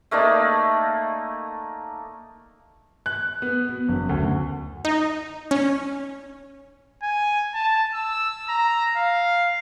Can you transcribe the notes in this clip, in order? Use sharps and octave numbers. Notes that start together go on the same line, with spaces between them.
A3 A#3 D#4 D5
F#6
B3
B2
F#1
D2
D#4
C#4
G#5
A5
E6
A#5
F5